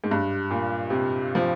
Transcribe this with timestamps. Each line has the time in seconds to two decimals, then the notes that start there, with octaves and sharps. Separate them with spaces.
0.04 G#2
0.11 G2
0.50 A#2
0.90 C3
1.35 F3